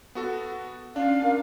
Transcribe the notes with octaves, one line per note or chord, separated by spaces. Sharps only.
B3 F#4 A4
C#4 D4 F5
A#4